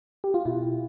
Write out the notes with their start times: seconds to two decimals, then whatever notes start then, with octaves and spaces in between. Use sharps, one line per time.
0.24 G4
0.34 F4
0.45 B2 E4